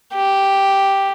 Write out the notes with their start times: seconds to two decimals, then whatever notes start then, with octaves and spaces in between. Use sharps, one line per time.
0.14 G4